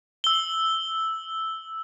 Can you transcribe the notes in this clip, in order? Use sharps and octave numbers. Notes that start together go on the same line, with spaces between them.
E6 G7